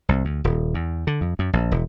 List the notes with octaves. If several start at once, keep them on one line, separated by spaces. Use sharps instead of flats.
C2
D2
D#1
E2
D3
F2
F#2
A#1
E1